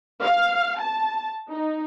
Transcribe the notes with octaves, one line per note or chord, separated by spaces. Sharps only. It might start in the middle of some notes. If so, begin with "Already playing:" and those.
F5
A5
D#4